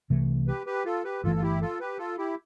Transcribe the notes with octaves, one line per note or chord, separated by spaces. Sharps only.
C2 C3 E3 A3
G4 B4
G4 B4
F4 A4
G4 B4
G1 F2 E3 A3 F4 A4
F4
E4 G4
F4 A4
G4 B4
F4 A4
E4 G4